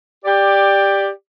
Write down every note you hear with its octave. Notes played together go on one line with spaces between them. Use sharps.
G4 D5